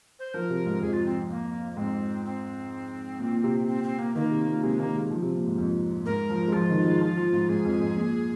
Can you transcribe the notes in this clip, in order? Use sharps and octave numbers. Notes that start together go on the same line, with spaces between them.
C5
F3 A#4
C3
G#2
F2 G#4
F4
C4
A#3
A#3
G#2 C4
C4
A#2
A#2
C3
C4
C4
A#3
D#3 A#3
C3
A#2
C3 G#3
D#3 A#3
G#3
F3
C3
A#2
G#2
F2
G#2 A#4
F3
G#3
F3 F4
D#3
G#3
F3
F3
G#2
G#2 G#4
F2
G#2
A#2